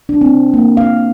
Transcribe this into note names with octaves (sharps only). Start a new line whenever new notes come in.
D4
C4
A#3
F5